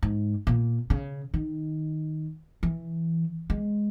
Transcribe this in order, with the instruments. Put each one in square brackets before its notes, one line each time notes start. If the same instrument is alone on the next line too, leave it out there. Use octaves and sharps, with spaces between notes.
[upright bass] G#2
A#2
C#3
D#3
E3
G#3